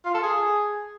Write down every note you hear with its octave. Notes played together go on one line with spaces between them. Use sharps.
F4
A4
G#4